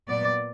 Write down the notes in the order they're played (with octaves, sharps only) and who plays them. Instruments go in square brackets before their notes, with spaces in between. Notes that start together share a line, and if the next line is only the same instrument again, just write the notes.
[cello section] A#2 F#3 B3 D5